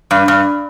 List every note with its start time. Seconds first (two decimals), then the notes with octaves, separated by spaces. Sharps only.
0.11 G2
0.28 G2